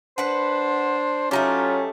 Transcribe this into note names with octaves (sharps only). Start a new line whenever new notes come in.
D4 B4 C5 F#5
F#3 A3 C#4 D#4 F4 G4